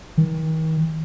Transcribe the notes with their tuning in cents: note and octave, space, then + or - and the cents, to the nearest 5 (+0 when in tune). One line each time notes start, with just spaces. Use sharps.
D#3 +40